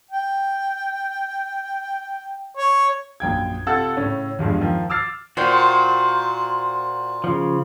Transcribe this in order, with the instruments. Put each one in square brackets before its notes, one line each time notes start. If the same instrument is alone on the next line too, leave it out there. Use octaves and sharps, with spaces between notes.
[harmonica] G5
C#5
[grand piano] A#1 F#2 G5 G#6
C3 F4 A4 F#5 E6 A6
A2 C#3 C#4
E2 G2 F3 G#3
D#3 F3
D6 E6 F6 A6 C7
[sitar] A#2 [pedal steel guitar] F#4 C5 G5
[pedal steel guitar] C#3 F3